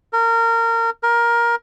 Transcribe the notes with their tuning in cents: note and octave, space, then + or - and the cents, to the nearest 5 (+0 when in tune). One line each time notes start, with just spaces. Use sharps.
A#4 -25
A#4 +15